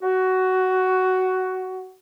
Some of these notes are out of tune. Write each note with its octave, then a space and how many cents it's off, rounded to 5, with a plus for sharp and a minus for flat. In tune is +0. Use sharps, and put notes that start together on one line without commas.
F#4 +10